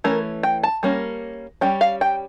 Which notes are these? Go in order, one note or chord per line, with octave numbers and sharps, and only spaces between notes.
E3 A3 C#4 A#4
G5
A5
G3 A#3 C#4
G3 C#4 G5
F5
G5